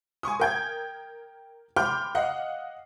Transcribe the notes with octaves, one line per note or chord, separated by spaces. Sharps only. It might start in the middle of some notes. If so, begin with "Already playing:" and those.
G#5 C6 C#6 D#6
A#4 G5 G#6
G5 B5 C6 D6 F6
D#5 F5 F#5